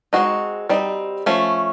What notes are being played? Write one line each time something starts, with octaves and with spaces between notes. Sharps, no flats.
G#3 C4 D#4 F#4
G3 C4 D#4
F3 A3 C#4